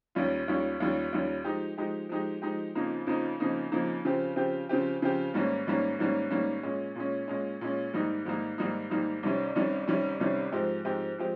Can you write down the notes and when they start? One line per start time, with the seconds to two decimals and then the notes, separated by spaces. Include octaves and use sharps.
0.15 D#2 D#3 G3 C#4 F4
0.48 D#2 D#3 G3 C#4 F4
0.80 D#2 D#3 G3 C#4 F4
1.13 D#2 D#3 G3 C#4 F4
1.44 F3 G#3 D#4 G4
1.78 F3 G#3 D#4 G4
2.09 F3 G#3 D#4 G4
2.42 F3 G#3 D#4 G4
2.75 F2 C#3 F3 A#3 D#4
3.07 F2 C#3 F3 A#3 D#4
3.40 F2 C#3 F3 A#3 D#4
3.72 F2 C#3 F3 A#3 D#4
4.05 C#3 F3 C4 G4
4.36 C#3 F3 C4 G4
4.69 C#3 F3 C4 G4
5.02 C#3 F3 C4 G4
5.34 G#2 D#3 G3 A#3 C#4
5.67 G#2 D#3 G3 A#3 C#4
5.99 G#2 D#3 G3 A#3 C#4
6.31 G#2 D#3 G3 A#3 C#4
6.63 A#2 G#3 C#4
6.96 A#2 G#3 C#4
7.28 A#2 G#3 C#4
7.61 A#2 G#3 C#4
7.93 G#2 D#3 G3 A#3 D#4
8.25 G#2 D#3 G3 A#3 D#4
8.58 G#2 D#3 G3 A#3 D#4
8.90 G#2 D#3 G3 A#3 D#4
9.23 C2 C3 D#3 G3 C#4
9.55 C2 C3 D#3 G3 C#4
9.87 C2 C3 D#3 G3 C#4
10.20 C2 C3 D#3 G3 C#4
10.52 G#2 F3 G#3 C4 G4
10.85 G#2 F3 G#3 C4 G4
11.18 F3 G#3 C4 G4